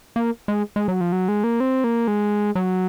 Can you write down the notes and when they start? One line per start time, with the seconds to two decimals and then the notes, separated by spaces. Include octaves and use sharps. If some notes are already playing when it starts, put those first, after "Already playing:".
0.16 A#3
0.48 G#3
0.76 G#3
0.88 F#3
1.01 F3
1.12 F#3
1.28 G#3
1.44 A#3
1.60 C4
1.84 A#3
2.08 G#3
2.55 F#3